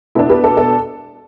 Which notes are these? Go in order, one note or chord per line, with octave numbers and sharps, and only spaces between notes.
B2 B3 D4 E4 A4
G4 B4
A4 D5
A4 D5